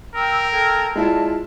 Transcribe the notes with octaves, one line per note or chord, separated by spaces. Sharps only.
A#4 G5 E6
A4 G5 G#6
G#3 E4 F4 D5 A5